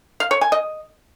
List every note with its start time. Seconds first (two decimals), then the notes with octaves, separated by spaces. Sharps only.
0.20 F5
0.31 C#5
0.41 G#5
0.52 D#5